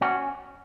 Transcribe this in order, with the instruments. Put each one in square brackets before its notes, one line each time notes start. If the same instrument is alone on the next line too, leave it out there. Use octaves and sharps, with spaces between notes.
[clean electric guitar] C#4 F#4